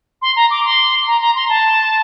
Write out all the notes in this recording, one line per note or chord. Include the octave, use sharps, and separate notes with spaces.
C6
A#5
D6
C6
A#5
A#5
C6
A5